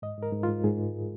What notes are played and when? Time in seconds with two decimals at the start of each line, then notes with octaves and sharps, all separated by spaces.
0.02 G#2 D#5
0.18 G#2 A#4
0.32 G#2
0.43 F4
0.49 G#2
0.64 G#2 G#4
0.79 G#3